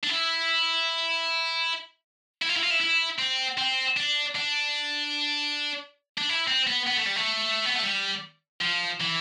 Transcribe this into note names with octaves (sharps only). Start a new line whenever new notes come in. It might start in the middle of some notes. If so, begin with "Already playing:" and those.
D4
E4
E4
F4
E4
F4
E4
E4
C4
C4
D4
D4
D4
E4
C4
B3
B3
A3
G3
A3
B3
A3
G3
F3
E3